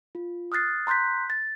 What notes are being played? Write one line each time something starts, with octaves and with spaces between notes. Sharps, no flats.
F4
D#6 F6 F#6 A6 C7
A#5 C6 F#6 G6 B6
A6